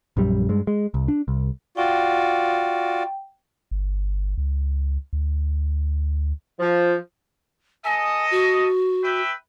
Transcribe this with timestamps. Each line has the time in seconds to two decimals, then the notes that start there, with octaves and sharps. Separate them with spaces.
0.17 A#1 F#2 G3
0.49 G2 G#3
0.67 G#3
0.94 C2
1.08 D4
1.28 C2
1.77 F4 F#4 D5 G5
3.71 G1
4.38 C#2
5.13 D2
6.59 F3
7.84 A4 D#5 G#5
8.31 F#4
9.03 B4 E5 G5